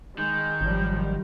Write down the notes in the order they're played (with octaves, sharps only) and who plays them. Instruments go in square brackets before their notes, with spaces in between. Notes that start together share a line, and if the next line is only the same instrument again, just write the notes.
[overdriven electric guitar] D#3 [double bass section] G#3 [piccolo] G6
[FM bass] G#1 [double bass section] F#2 F3 G3